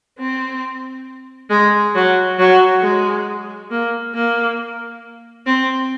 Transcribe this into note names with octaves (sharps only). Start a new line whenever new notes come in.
C4
G#3
F#3
F#3
G#3
A#3
A#3
C4